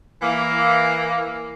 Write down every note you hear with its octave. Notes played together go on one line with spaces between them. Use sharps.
E3 A#3